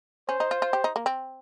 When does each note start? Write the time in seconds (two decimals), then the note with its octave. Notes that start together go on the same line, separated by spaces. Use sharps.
0.29 C#4 C5
0.40 D#4
0.51 F4
0.62 F4
0.73 G4
0.84 D#4
0.96 A#3
1.06 C4